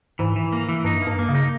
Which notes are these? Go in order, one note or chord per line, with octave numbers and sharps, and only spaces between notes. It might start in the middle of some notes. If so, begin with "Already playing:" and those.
G#2 E3
E3
A#3
E3
G2 D#4
G2 A#3
A#3
C#3
D#4